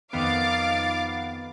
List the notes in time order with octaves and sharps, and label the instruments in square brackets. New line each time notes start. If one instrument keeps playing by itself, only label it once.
[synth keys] F2 D#3 B3 [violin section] F5 D6 A6